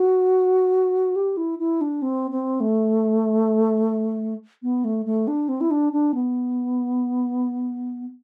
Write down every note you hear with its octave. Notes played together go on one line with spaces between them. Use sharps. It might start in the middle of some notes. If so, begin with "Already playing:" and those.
Already playing: F#4
G4
E4
E4
D4
C4
C4
A3
B3
A3
A3
D4
C4
E4
D4
D4
B3